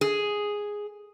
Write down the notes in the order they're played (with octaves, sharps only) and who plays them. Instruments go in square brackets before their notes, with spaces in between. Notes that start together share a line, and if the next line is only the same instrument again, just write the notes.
[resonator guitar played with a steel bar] G#4